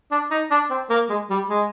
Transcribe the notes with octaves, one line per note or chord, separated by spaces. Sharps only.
D4
D#4
D4
C4
A#3
G#3
G3
G#3